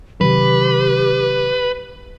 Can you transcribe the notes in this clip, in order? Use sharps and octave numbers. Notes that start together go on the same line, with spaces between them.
C3 D#3 F#3 G4 B4